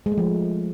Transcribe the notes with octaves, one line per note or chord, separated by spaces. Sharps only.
G#3
A3
F3